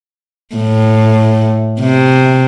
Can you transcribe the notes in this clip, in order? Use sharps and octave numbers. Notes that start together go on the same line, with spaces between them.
A2
C3